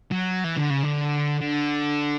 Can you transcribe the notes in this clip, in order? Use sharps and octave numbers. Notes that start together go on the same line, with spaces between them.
F#3
E3
D3
C#3
D3
D3